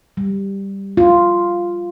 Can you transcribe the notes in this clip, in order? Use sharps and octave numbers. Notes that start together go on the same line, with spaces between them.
G3
F4